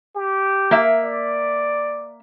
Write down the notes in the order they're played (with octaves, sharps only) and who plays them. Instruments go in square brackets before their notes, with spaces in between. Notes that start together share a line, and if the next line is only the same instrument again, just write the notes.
[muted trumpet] G4
[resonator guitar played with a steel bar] A#3 E5
[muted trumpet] D5